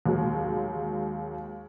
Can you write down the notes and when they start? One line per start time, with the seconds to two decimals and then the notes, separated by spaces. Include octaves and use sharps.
0.06 D#2 F#3 G#3